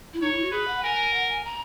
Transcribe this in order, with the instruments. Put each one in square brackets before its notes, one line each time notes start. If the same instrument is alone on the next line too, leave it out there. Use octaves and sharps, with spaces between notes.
[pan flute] E4
[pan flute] D#4 [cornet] C#5
[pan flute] E4
F#4
[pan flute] G#4 [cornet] B4
[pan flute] F#5
[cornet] A#4 [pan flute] G#5
[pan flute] F#5
G#5
A#5